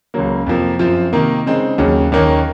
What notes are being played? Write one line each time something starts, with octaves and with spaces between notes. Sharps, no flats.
C#2 C#3 F#3 A#3
F2 C3 F3 A#3
F#2 F3 C4 F4
C3 D#3 A#3
C#3 G#3 C4 D#4
D#2 C#3 F#3
D#2 D#3 A#3 C#4